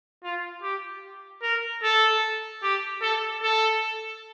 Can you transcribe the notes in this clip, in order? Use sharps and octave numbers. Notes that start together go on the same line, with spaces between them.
F4
G4
A#4
A4
G4
A4
A4